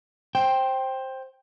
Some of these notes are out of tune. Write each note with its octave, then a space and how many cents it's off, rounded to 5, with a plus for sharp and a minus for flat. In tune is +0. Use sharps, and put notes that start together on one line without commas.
C5 +15 G5 +0